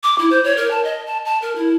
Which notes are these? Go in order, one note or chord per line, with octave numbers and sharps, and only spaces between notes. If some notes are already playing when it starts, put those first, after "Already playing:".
D6
E4
C5
C#5
A#4
A5
D#5
A5
A5
A#4
E4